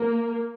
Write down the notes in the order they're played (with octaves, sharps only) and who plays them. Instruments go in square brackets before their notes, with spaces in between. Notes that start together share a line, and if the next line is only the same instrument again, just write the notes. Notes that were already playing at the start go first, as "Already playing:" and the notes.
Already playing: [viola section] A#3